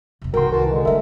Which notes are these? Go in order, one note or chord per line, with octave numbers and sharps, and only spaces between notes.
F2 C3
C2 D#3 F#4 A#4 G5 C6
E3 F#4 A#4 A5
D3 G#3
A3 E4 A#4 E5